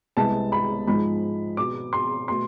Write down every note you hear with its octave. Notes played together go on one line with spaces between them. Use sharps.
C2 C3 G#3 B3 A5
B5
G#2 F3 G#3 B5
B2 B3 D6
C6
B2 A3 C6